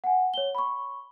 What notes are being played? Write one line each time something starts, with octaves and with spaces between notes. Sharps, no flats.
F#5 G#5
C#5 G7
B5 C#6